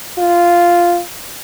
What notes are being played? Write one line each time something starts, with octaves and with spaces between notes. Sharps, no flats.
F4